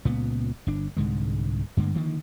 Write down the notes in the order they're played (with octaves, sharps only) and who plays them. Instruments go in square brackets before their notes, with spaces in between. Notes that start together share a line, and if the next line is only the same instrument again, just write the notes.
[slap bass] C#2 A#2 B3
G1 D4
C2 G#2 D3 G#3
G2 D3 G#3 A#3
D3 D#3 F3 A#3